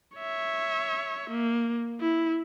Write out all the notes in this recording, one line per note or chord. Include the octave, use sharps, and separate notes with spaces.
C#5 E5
A#3
E4